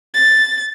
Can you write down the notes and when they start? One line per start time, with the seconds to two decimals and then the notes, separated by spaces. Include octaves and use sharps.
0.14 A6